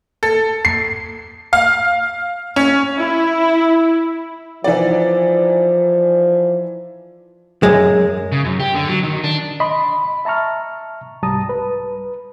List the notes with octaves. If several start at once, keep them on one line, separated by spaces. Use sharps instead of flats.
A4
C7
F5
C#4
E4
E3 F3 D#4 D5
F#2 G#3
C#3
F#2
G4
D3
F#3
D#3
D4
D#5 B5 C6
E5 A5 A#5 C#6 F6
C2 G#2 G3 A5 A#5 D#6
B4